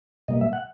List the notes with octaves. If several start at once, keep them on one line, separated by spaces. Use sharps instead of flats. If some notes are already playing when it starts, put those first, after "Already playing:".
B2 G3 A#3 D#5
E5
F#5